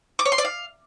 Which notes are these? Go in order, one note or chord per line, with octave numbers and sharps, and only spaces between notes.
D6
C#5
C6
D5
F5